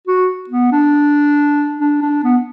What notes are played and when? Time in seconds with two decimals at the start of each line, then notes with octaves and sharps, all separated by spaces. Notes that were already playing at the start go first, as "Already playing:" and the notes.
0.07 F#4
0.50 B3
0.72 D4
1.80 D4
2.02 D4
2.24 B3